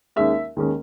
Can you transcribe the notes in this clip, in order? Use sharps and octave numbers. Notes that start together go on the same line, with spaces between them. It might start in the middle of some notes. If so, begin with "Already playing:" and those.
D#2 D#3 G#3 C#4 E5
D#2 D#3 G#3 C#4